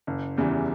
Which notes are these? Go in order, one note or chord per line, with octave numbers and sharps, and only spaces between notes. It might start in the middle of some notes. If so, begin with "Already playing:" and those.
F#1
E2 C#3 E3 G3